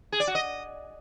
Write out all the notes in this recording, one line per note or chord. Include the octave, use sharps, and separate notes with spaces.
G#4
D5
F#4
D#5